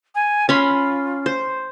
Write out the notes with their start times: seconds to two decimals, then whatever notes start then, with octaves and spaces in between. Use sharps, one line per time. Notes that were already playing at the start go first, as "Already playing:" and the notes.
0.15 G#5
0.49 C#4 F4 B5 C6
1.26 C5